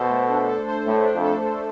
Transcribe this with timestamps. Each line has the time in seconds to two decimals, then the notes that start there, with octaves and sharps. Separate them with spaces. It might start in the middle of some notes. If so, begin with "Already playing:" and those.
Already playing: B2 A4 C5
0.09 A3
0.29 D4
0.48 A4
0.68 C5
0.86 A2 A3
1.05 D4
1.14 F2
1.24 A4
1.44 C5